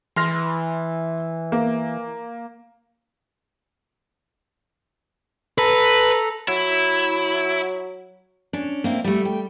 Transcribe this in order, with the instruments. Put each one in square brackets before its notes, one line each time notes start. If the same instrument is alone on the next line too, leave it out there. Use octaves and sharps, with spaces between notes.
[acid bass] E3 [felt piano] C6 F6 A#6
[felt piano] A#3
[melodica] A4 A#5 [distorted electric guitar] B4
[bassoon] F#3 [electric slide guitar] E4
[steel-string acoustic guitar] C#4 [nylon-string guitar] D4
[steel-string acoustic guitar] A#3 C4 E4
[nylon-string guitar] G3 [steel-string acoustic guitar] A3 B3
[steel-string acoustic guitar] G5